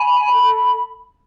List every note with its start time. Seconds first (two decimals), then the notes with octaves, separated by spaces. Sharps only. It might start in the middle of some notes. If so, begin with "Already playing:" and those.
Already playing: G#5 B5
0.32 A4